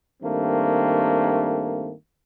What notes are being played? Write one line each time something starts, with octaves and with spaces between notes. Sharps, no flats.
G2 D#3 A3 A#3 C4